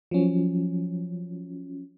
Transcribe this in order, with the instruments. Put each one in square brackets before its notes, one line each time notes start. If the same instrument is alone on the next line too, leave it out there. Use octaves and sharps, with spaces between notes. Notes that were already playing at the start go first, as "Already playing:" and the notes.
[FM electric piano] F3 F#3 C#4